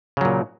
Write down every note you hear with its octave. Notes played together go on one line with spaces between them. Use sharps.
A#2 C#3 F#3